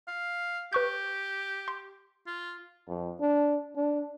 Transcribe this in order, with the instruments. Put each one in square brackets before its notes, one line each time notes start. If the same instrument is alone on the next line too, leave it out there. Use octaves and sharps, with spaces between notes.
[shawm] F5
[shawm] G4 [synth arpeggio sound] B4 C#6 G6
[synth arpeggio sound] C6
[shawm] F4
[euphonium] F2
D4
D4